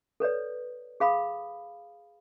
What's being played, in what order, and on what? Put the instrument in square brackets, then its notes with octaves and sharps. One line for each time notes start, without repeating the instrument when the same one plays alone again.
[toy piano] A4 B4 C#5 D5
G#4 F5 B5 D#6